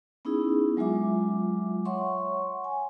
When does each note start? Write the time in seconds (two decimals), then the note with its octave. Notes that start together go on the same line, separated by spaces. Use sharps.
0.25 B3 C#4 D#4 E4 G#4
0.77 F#3 G#3 F4 E5 D6
1.85 C#5 E5 F#5 C6 C#6
2.64 G#5